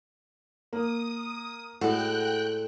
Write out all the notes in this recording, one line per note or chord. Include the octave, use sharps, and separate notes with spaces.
A#3 D#6
A2 G#3 F#4 A4 G5 F#6